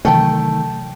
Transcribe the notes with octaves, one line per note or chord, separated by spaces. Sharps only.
C3 D#3 E3 F#3 A3 G5 A5